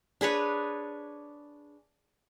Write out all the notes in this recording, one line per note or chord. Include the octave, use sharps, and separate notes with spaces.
D4 G#4 B4 C#5